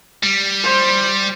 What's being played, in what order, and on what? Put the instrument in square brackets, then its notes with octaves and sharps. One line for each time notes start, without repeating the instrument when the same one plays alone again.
[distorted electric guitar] G3
[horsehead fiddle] C5